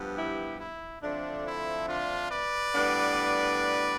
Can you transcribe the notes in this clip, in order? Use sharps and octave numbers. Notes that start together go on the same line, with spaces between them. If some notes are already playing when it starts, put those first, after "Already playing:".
Already playing: G2 F3 B3
E4 G4
E4
D3 F3 A3 C4 D4
E4
D4 F4
B4 D5
A2 G3 B3 D4